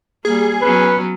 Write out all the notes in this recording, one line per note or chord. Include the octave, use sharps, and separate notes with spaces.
G3 A#3 G#4
F#3 B3 C#4 B4